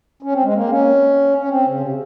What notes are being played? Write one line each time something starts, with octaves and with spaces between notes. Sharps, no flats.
C#4
C4
G#3
A#3
C4
C#4
C#4
C4
C#3
C3